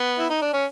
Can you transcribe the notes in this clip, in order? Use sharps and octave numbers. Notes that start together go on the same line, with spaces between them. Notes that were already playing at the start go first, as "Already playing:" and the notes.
Already playing: B3
E4
D#4
D4
C#4